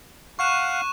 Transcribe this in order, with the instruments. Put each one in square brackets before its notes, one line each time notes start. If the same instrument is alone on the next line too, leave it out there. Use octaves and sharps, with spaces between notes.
[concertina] F5 F#5 [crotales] C#6 F#6 E7